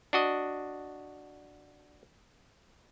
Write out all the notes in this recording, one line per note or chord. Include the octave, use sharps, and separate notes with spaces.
D4 F#4 D#5